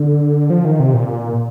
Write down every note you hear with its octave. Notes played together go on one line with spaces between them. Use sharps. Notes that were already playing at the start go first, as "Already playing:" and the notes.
Already playing: D3
F3
D#3
C3
A#2